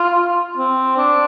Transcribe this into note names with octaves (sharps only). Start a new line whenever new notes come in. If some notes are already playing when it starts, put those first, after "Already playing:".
Already playing: F4
C4
D4